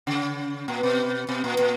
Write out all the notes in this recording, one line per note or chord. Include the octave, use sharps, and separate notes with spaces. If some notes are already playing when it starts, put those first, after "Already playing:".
C#3
A#2
B2
B2
A#2
A#2